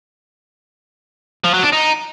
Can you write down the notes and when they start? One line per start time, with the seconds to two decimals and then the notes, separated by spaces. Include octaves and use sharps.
1.44 F3
1.54 F#3
1.63 D4
1.72 D#4